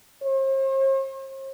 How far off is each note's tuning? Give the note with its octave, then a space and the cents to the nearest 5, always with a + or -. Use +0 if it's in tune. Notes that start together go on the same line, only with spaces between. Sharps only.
C5 +45